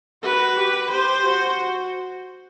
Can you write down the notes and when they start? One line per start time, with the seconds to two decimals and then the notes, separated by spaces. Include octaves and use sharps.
0.23 F#4 B4
0.57 G4
0.91 G4 C5
1.25 F#4